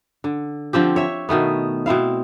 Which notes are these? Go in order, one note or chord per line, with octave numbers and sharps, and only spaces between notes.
D3
D3 F3 C4 G4
C#5 E5
B2 D#3 A3 B3
B2 C4 E4 F5